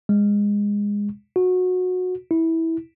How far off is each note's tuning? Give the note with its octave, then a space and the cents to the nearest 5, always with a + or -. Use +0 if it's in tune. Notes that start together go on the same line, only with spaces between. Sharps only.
G#3 -20
F#4 -20
E4 -15